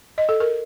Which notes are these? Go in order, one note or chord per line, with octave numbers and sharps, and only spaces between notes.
D#5
A4
A#4